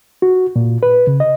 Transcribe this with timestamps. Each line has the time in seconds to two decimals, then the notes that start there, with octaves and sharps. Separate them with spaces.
0.22 F#4
0.56 A#2
0.83 B4
1.07 C#3
1.20 D#5